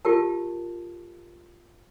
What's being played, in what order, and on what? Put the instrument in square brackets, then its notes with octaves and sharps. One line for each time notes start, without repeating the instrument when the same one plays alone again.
[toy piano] F4 G4 A#4 A5